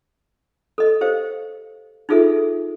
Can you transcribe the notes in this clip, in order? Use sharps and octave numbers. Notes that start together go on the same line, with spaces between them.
A4 D#5
G4 C5 F5
D#4 F4 G#4 A4 E5